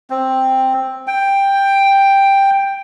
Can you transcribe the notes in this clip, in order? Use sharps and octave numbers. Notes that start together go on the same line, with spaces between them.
C4
G5